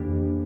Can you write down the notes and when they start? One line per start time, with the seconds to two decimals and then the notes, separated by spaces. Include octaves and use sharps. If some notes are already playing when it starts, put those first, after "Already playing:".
Already playing: F2 E3 A#3 D4 G4